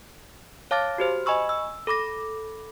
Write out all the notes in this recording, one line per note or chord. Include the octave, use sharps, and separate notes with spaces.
C#5 F5 A5 D6 F6 A6
F#4 G4 C5
D#5 G#5 B5 C#6 E6
E6
A4 B5 D6 A#6